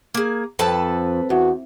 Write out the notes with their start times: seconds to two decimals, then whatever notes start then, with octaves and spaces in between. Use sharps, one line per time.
0.14 A#3 G#4
0.59 F2 A4 B4 A5
1.30 E2 F#4